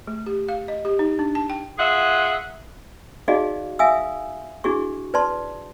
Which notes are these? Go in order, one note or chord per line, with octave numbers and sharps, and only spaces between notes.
A3
G4
F5
D#5
G4
D#4
D4
A5
G5
F4 G#4 E5 F#5
D#4 F#4 G#4 D5 D#5 F5
E5 F5 G#5 D#6 E6
D4 E4 F#4 G#4 C#6
B4 D5 A5 C6